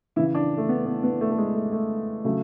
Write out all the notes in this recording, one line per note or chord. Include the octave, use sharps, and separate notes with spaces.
C#3 E3 E4
D4
A3
B3
B3
B3
A3
A3
G#3
A3
A3
C#3 F#3 A3